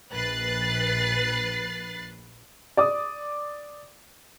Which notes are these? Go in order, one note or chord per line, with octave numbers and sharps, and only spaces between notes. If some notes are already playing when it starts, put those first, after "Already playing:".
A#1 B4 F#6 A6 C7
D5 D6 D#6